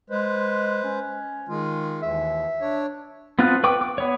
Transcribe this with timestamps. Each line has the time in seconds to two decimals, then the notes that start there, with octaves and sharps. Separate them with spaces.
0.10 G#3 B4 C5
0.84 C#4
1.48 D#3 G#3 F4
2.03 D#2 E3 E5
2.61 D4 C#5
3.39 B3 C4 F4 A5 F#6
3.64 B4 G5 C#6 D6
3.81 D6
3.98 B3 C#5